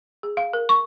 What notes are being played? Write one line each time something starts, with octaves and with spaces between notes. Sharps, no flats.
G#4
F5
A#4
C#6